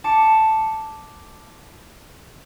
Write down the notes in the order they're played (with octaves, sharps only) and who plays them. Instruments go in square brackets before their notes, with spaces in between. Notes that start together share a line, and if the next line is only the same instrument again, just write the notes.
[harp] A5 D6 C#7